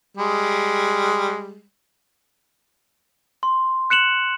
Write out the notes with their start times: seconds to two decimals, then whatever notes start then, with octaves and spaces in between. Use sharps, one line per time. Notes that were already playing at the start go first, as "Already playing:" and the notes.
0.17 G3 G#3
3.43 C6
3.90 F#6 C#7 E7 F#7